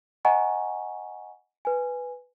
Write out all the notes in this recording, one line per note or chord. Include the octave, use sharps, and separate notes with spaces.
D#5 F#5 G#5 A#5 C#6
B4 G#5